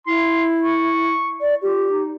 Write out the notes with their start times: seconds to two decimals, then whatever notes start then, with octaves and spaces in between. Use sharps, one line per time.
0.07 E4 C6
0.62 C#6
1.41 D5
1.62 F4 G4
1.90 D#4